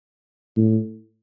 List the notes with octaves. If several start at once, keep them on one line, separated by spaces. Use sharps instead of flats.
A2